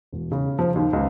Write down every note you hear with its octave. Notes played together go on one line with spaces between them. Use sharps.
E1
C#3
F3
D#2
C#2